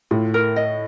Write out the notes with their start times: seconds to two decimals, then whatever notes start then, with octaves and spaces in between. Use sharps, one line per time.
0.11 A2 F4
0.34 A#4
0.56 D#5